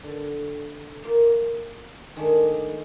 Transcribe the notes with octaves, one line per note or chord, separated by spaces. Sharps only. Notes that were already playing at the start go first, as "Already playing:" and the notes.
D3
A#3 F4
D#3 G#3 A3 D4